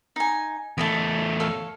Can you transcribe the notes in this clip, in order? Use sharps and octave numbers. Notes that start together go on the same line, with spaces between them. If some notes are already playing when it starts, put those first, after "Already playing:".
D#4 G#5
E2 A3 E4 D#5 A5
A4 C#5 F5